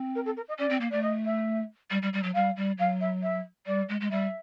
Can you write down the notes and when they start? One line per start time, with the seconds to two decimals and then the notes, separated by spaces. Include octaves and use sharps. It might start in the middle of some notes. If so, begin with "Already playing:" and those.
Already playing: C4
0.15 A#4
0.26 A4
0.37 A#4
0.48 D#5
0.59 C#4 D5
0.70 C4
0.81 A#3
0.91 A3 D5
1.03 D#5
1.25 E5
1.91 G3
2.02 G3
2.13 G3
2.23 F#3
2.34 G3 F5
2.56 G3
2.78 F#3 F5
3.01 E5
3.23 E5
3.67 G3 D5
3.89 G#3
4.01 G#3
4.11 G3 E5